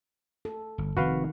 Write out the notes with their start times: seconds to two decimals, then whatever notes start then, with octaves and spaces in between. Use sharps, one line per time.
0.45 A4
0.78 G1
0.97 F1 D#3 C4 F#4 B4 F5